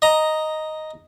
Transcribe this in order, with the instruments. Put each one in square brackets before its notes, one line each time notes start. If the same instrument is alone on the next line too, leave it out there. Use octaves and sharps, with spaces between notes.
[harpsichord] D#5 A#5